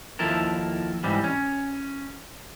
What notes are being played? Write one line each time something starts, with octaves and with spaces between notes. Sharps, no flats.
D#2 F3 E4 A4 A#4
G#2 E3 G3 C4
C#4